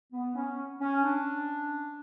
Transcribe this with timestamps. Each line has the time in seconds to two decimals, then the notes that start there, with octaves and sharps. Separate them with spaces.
0.13 B3
0.36 C#4
0.81 C#4
1.04 D4